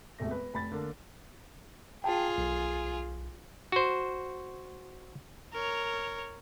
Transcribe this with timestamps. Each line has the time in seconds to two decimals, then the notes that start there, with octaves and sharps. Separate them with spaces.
0.19 E1 C3 A3 A#6
0.31 B4
0.54 F1 B5 A6
0.72 D3 A#3 D4
2.04 F4 G#4 G5 A5
2.38 B1
3.72 F#4 C5
5.53 A#4 C#5